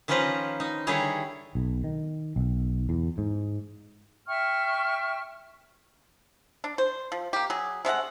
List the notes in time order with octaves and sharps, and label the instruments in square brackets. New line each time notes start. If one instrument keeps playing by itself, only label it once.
[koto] D#3 F3 C#4 B4 C5 A#5
D#4
D3 D#3 G3 E4 G#4 C#5
[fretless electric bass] B1
D#3
B1
E2
G#2
[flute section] E5 G5 C#6 F6
[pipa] D4
C5
F3
A#3 G4
F#3 G#4
C3 G#3 A3 F#5